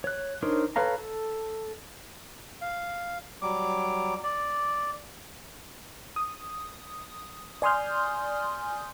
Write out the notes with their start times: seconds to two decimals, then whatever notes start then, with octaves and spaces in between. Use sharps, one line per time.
0.04 C#5 F#6
0.42 D4 D#4 A#4 C5 C#5
0.76 A4 B4 C#5 F5 A#5
0.98 A4
2.61 F5
3.42 F#3 G3 D6
4.23 D5
6.16 D#6
7.62 D5 G#5 C6 D#6 F6 G6